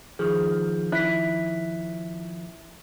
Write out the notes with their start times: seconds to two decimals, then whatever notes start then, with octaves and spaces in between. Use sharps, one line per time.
0.19 D#3 F3 G#4
0.92 E4 F#6 B6